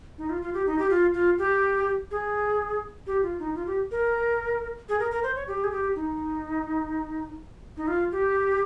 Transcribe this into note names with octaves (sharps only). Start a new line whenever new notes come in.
D#4
F4
F4
G4
D#4
G4
F4
F4
G4
G#4
G4
F4
D#4
F4
G4
A#4
G#4
A#4
A#4
C5
C#5
G4
G#4
G4
D#4
D#4
F4
G4